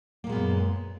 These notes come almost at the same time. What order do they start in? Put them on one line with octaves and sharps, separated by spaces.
A#3 A#2 G#3 B3 F#2